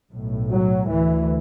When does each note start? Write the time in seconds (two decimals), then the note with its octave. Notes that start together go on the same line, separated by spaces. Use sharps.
0.11 B1 A2
0.50 F#3
0.89 D2 E3